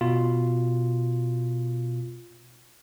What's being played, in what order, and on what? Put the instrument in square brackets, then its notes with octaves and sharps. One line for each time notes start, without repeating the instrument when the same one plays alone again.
[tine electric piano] B2 F4